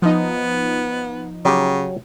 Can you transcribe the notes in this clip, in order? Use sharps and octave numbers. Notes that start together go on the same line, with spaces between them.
F3 B3 D#4
C#3 F#3 G4